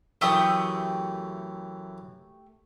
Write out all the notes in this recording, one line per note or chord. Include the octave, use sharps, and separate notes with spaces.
F#2 E3 A3 G4 G5 D#6